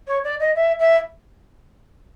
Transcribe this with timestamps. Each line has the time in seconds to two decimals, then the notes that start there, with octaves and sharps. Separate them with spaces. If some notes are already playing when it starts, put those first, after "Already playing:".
0.07 C#5
0.24 D5
0.40 D#5
0.55 E5
0.79 E5